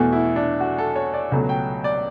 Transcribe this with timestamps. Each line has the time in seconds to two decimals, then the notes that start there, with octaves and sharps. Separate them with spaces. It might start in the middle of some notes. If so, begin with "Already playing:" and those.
Already playing: E2 B2 A3 F#4
0.12 E4
0.36 D4
0.60 F#4
0.78 A4
0.96 C#5
1.14 D5
1.32 C#2 B2 F#3 A3
1.49 G5
1.84 D5